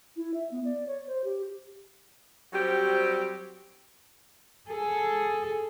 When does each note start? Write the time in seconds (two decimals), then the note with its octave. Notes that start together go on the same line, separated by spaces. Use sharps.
0.16 E4
0.34 E5
0.51 B3
0.65 D5
0.87 C#5
1.07 C5
1.24 G4
2.53 F#3 G3 C4 G4 C5
4.69 G#4 A4